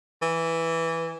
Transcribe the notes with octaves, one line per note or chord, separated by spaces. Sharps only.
E3